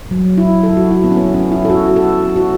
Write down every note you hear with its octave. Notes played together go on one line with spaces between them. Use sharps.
F#3
E4
A4
F#4
E4
B3
C#4
B3
C#4
E4
A4
F#4
A4
F#4